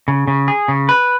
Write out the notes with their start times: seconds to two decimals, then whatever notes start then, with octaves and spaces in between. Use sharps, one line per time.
0.08 C#3
0.28 C#3
0.48 G#4
0.68 C#3
0.89 B4